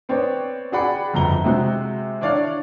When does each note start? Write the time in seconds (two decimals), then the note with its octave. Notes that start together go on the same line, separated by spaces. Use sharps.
0.09 B3 C4 C#5 D5
0.72 F#4 G#4 D5 F#5 G5 B5
1.14 G1 F2 A#5 G7
1.44 C3 G#3 C4 F#4
2.21 D4 E4 C#5 D5 F5